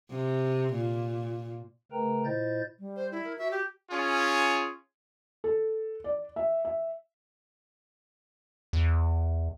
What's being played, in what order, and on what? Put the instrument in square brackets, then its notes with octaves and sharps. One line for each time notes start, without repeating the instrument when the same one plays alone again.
[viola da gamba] C3
A#2
[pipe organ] C#3 A3 A#4 B4 G5 A#5
A#2 E4 C5 D#5 G6 A6
[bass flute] G3
[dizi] C5
E4
[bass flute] A#4
[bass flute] F#4 [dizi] E5
[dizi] G4
[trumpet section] C#4 F4 G#4
[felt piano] A4
D5
E5
E5
[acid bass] E2